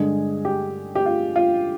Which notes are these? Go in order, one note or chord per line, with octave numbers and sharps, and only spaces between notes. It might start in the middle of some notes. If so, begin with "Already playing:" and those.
Already playing: G2 D3 G#3 G#4
G4
G4
F4
F4